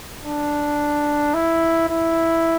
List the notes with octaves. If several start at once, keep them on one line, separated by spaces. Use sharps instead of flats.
D4
E4
E4